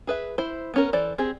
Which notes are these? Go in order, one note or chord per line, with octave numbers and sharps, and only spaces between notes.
G#4 B4 E5
E4 C5
B3 C#4 A#4
E3 A4 C5 D5
C4 G4 G#4